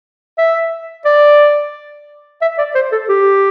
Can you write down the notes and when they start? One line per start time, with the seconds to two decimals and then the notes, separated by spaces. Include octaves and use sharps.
0.38 E5
1.05 D5
2.42 E5
2.58 D5
2.75 C5
2.92 A4
3.09 G4